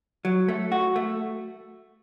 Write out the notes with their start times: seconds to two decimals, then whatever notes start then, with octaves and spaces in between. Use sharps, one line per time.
0.25 F#3
0.48 A3
0.72 F#4
0.96 A3